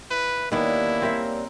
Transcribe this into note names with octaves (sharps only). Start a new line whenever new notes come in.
E4 B4
D#3 G3 A#3 B3 C#4 D4 E4
C4 A#4 E5